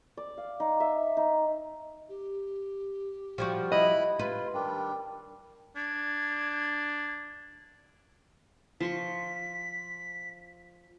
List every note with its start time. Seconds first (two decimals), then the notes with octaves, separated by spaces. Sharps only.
0.17 D5
0.37 F5
0.60 D#4
0.80 E5
1.17 D#4
2.09 G4
3.38 F3 G3 F#4
3.72 E4 D#5 B5 F#6
4.19 F4 B4
4.54 D#3 G3 D4 G5
5.76 D4 G#6
8.80 F3 C6 C#6 B6